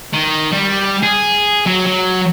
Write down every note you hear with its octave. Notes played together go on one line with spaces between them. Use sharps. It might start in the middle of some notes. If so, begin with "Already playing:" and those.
D#3
G3
G#4
F#3
F#3